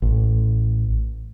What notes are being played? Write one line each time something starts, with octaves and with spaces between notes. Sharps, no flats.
A1